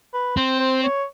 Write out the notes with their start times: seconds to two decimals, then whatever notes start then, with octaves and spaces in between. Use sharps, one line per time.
0.14 B4
0.37 C4 C5
0.60 C5
0.83 C#5